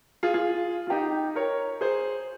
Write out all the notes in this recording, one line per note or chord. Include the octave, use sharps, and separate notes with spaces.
F4 G#4
F4 G#4
F4
D#4 G4
A#4 C#5
G#4 C5